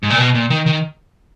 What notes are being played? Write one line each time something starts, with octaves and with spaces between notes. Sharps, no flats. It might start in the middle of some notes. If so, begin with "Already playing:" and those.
G#2
A#2
B2
A#2
D#3
D#3